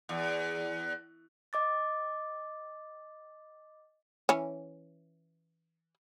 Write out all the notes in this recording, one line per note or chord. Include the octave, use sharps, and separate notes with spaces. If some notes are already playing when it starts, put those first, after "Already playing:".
E2
D#5 D6 A6
E3 C#4